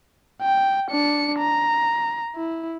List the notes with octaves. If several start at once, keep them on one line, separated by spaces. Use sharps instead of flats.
G5
D4 C#7
A#5
E4